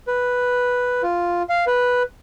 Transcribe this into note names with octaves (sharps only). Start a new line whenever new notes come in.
B4
F4
F5
B4